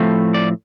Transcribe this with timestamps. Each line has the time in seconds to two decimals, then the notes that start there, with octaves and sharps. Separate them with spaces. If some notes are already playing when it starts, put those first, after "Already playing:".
Already playing: A2 F3 A3 C4
0.34 D5